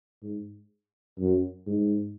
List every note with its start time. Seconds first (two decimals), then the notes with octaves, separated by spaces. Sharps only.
0.23 G#2
1.20 F#2
1.67 G#2